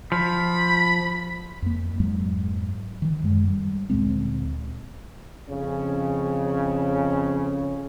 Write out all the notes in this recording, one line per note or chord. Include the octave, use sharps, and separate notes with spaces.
F3 B5
F2 A#3
F2 G#2 F#3 G#3
D#3 E3
F#2 G#3
G3
D2 A#2 G#3 C4
F2 C#3 C#4